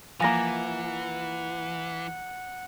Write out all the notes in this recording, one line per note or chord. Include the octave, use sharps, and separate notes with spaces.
E3 F3 A#3 F#5 G#5 A#6